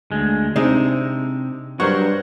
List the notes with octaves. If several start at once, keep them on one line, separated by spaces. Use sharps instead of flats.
D2 G#3
C3 G#3 C4 D4 D#4
G2 F#3 A#4 C5 F#5 C#6